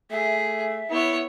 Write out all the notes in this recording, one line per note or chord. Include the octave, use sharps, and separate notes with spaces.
A3 G#4 E5
B3 E4 C#5